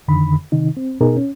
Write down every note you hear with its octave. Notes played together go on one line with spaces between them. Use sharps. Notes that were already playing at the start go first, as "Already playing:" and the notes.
F2 D3 D#3 B5
C3 D#3 D#4
C4
B2 B3 D#4 G#4 A#4
C#4